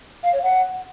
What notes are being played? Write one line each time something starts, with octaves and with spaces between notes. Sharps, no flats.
F5
C#5
F#5